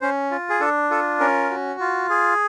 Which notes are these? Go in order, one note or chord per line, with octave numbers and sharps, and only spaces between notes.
C#4 C5
F4
G#4
D4 A4
F4 A4
C#4 A#4
F#4
F4
G#4